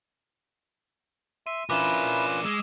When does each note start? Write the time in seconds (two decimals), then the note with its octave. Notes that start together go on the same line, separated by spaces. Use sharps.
1.47 E5 C6 D#7
1.70 C#4 D4 E4 F4 A#4 B4 D6 E7
2.44 G#3 D#6 E6 E7